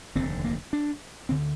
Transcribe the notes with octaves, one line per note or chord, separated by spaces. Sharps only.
F1 D#2 D3 C4
A#3
D4
D2 D3 C4